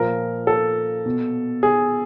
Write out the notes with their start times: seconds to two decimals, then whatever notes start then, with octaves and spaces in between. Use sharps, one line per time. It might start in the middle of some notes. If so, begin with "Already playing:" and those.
Already playing: A#2 F3 A#4
0.47 A4
1.06 B2
1.63 G#4